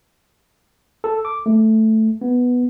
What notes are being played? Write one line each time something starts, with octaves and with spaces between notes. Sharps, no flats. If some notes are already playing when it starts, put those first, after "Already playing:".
A4
D6
A3
B3